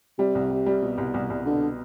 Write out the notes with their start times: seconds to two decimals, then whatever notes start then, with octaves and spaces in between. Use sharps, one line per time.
0.19 C3 G3
0.35 C2
0.51 G3
0.66 G3
0.82 B2
0.98 C2
1.14 C2
1.30 C2
1.46 B2 D3